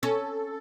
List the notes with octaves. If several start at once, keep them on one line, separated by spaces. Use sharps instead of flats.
C#4 A4